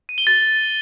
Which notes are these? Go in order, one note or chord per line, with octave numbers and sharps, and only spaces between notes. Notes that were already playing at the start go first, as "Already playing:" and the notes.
D#7
G7
A6